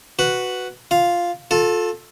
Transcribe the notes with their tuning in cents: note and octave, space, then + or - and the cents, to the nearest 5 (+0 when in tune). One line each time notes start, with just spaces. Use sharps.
F#4 +0 B4 +0
F4 +0 F5 +0
F4 +35 A4 +0